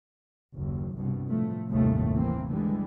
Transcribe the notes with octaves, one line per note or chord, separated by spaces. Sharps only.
F#1 D#2
C2 G2 B2
A2 F3 A3
G1 D#2 A2 C3 A3
E3 A#3 C4
D3 E3 G3 G#3